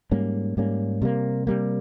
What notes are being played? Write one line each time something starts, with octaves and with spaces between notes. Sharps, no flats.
G#2 G3 A#3 C#4
G#2 G3 A#3 C#4
C3 G3 A#3
C3 G3 A#3